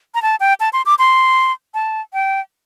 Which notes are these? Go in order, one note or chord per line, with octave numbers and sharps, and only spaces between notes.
A#5
A5
G5
A5
C6
D6
C6
A5
G5